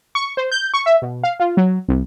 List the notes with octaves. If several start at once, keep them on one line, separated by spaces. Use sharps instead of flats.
C#6
C5
G6
C#6
E5
B2
F5
F4
F#3
C2